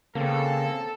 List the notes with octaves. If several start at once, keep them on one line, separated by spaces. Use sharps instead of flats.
C#3 A#3 C4 A4